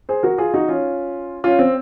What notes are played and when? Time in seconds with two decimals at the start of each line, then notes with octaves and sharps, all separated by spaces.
0.09 G#4 C5
0.23 F#4 A#4
0.38 F4 G#4
0.54 D#4 F#4
0.68 C#4 F4
1.44 C#4 F4
1.59 C4